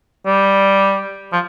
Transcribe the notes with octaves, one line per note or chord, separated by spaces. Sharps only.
G3
F3